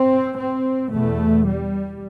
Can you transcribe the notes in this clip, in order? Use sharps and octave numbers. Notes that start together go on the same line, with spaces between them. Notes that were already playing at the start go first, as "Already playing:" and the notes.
Already playing: C4
C4
E2 B2 A3
G3